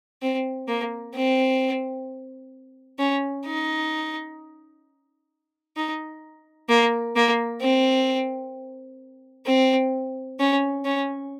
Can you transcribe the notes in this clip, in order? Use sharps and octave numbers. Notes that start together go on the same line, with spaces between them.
C4
A#3
C4
C#4
D#4
D#4
A#3
A#3
C4
C4
C#4
C#4